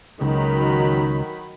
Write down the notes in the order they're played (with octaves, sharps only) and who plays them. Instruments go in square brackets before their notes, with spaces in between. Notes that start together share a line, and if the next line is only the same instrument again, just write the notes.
[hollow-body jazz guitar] C#2 [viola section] D#3 F#3 B5